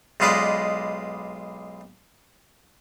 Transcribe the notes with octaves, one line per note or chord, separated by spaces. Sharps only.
B1 G#3 F4 B4 D5 D#5